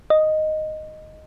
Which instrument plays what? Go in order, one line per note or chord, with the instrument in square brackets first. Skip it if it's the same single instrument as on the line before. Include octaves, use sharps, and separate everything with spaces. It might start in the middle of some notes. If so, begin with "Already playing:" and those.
[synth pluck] D#5